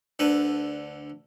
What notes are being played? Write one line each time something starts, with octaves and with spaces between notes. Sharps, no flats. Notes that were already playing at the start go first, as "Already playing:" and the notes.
D2 D3 B4